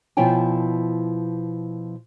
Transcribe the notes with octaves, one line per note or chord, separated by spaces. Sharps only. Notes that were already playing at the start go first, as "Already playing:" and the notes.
B2 F3 E4 C#5 G5 G#5